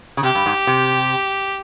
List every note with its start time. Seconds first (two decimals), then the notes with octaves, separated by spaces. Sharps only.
0.17 C#3
0.23 C3 G4
0.35 G2
0.46 G#2
0.67 C3